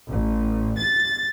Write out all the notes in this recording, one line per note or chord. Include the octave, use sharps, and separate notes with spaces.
A1
A6